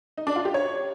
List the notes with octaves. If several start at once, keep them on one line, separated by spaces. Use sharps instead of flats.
D#4
D4
F4
G4
C#5